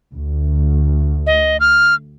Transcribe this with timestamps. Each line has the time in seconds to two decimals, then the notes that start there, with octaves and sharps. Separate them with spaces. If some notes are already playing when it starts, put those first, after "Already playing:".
0.13 D2
1.27 D#5
1.60 F6